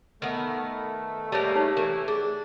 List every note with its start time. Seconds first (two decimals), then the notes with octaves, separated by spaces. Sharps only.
0.22 D#3 A3 B3
1.32 G3 G#3 A#3 G4 C#5 A5
1.56 D#4 C#5
1.77 E3 A#4
2.08 D4 G#4